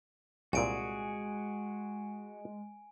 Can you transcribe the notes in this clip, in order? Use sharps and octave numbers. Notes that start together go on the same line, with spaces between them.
C2 A#2 G#3 F#4 G#4 G#5 D7